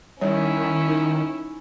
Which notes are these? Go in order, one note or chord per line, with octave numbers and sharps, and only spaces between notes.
D#3 G3 C#4 E4 C#5
D#4